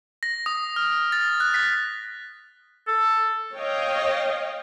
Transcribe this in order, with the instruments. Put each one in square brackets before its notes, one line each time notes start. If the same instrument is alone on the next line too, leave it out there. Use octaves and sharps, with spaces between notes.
[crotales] A#6
D#6
F6
A6
F#6
B6
[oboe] A4
[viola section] C#5 D#5 F5 G5